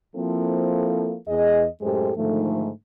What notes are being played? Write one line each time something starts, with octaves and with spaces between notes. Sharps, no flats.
F3 A#3 C4 E4 A4
E2 G#4 D#5
F#2 A2 G#3 G4 A4 C5
G#2 D3 D#3 F3 A3